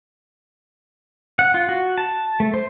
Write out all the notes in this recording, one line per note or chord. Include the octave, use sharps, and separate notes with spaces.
F#5
F4
F#4
A5
A3
C5